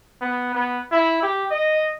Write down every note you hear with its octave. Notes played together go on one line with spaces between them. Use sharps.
B3
B3
E4
G4
D#5